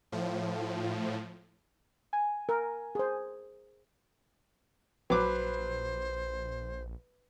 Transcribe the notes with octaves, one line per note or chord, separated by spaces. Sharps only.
A2 F3
G#5
A#4
G#4 C5
A#1 F#3 B4 C5 D6